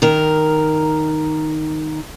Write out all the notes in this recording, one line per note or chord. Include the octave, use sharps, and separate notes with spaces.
D#3 A#4